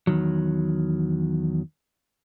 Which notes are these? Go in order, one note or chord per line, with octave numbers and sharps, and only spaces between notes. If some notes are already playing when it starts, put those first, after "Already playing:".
E2 D#3 F#3